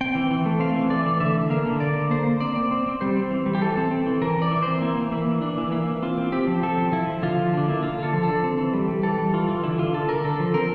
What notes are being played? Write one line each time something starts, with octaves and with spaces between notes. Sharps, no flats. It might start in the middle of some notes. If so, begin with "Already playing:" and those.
C4 G5
E3
E3
A3
C4 F5
E3
A3 D5
E3
D3 E5
D3
A#3 F5
D3
A#3 D5
D3
A#3 C5
A#3
C4 D5
C4
C4
C4
G3 C5
C4
E3
G3
G4
E3 A4
C4
C4
E3
E3 A#4
E3
D5
E3
C5
C4
A#3 E4
E3
A#3 E4
E3
E3 D4
E3
A#3 E4
E3
C4 F4
C4
C4 G4
F3
C4 A4
F3
F3 E4
F3
D3 F4
F3
D3 D4
A#3 E4
D3 F4
D3 A4
F3
D3 A4
C4
E3
G3
G3
E3 A4
G3
E3 F4
E3
D3 E4
D3 F4
D3 A4
D3 A#4
D3 A4
F3
C4 A#4